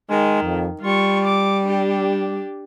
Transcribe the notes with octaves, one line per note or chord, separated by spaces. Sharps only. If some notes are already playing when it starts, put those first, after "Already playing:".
D#3 G#3
F2
G3 F4 C#6
D6
D4 G4